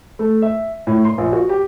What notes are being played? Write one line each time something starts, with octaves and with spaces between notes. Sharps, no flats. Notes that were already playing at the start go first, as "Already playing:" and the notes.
A3
E5
A2
C6
A#1
F#4
G4